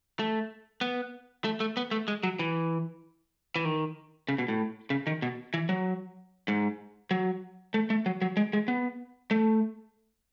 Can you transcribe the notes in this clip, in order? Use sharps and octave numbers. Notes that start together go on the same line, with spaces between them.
A3
B3
A3
A3
B3
A3
G#3
F#3
E3
E3
D#3
C#3
B2
A2
C#3
D#3
B2
E3
F#3
G#2
F#3
A3
A3
F#3
F#3
G#3
G#3
B3
A3